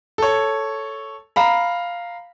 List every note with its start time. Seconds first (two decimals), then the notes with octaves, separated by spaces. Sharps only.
0.18 A4 C#5
1.36 F5 A#5 B5